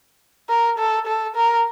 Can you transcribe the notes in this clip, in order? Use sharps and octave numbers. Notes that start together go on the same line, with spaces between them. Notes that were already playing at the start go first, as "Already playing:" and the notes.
A#4
A4
A4
A#4